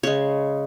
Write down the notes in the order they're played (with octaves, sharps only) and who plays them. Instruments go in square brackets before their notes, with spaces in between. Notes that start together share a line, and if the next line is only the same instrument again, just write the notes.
[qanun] C#3 G#3 C#5